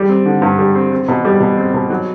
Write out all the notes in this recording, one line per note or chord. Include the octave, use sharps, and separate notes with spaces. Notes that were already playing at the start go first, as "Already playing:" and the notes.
Already playing: G3
C4
D3
G2
G3
C4
C4
B2
G3
B2
C4
B2
F#3